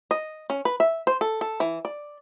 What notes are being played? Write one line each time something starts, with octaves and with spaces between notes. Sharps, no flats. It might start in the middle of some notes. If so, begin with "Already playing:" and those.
D#5
C#4
B4
E5
C5
A4
A4
E3
D5